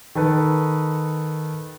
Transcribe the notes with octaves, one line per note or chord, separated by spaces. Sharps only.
D#3 A4 B4